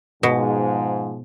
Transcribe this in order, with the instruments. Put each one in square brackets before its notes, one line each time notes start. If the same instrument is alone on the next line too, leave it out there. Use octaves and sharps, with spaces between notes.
[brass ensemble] G#2 F3 [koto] B2